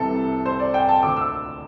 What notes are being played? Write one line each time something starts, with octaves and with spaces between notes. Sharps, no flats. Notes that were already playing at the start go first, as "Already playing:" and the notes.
Already playing: C2 C3 E3 A4
C5
D5
G5
A5
D2 D3 D6
E6